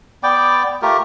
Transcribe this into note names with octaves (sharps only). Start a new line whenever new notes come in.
B3 D5 G5 D6
A3 F4 G4 A#4